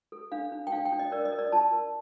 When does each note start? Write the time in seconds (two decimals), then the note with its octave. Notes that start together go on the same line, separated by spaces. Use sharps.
0.12 A4
0.32 D4 F5
0.52 D4
0.67 G5
0.72 D4 F5
0.85 G5
0.92 D4
0.99 D#5
1.12 A#4 D5
1.25 D#5
1.32 A#4
1.39 D5
1.52 F4 A5
1.72 A#4